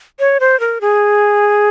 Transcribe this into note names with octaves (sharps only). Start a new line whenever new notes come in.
C#5
C5
A#4
G#4